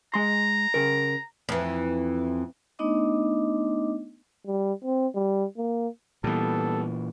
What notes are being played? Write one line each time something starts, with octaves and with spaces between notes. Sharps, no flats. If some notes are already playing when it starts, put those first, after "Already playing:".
G#3 A#5 C6
C#3 A#4
F2 E3
A3 B3 D4 D#4 D#5 D6
G3
C4
G3
A#3
A#2 E3 G3 B3 A4